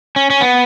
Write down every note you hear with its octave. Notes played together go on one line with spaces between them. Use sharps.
C#4
C#4
B3